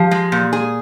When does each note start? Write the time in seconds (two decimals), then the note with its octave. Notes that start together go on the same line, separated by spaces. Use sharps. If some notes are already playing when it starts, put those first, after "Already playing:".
Already playing: F3 G4
0.11 G#3
0.32 A#2
0.53 G#4